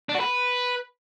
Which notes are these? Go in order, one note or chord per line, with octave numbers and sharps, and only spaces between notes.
D4
F#4
B4